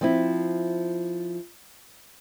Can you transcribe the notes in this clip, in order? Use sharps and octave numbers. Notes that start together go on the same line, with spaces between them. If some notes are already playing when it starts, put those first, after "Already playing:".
F3 C4 E4